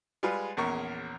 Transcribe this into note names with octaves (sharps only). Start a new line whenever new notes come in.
G3 G#3 F4 G#4 B4
A#1 E2 C#4 A#4 C#6